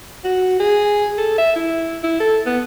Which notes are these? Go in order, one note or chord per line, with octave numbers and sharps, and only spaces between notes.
F#4
G#4
A4
E5
E4
E4
A4
B3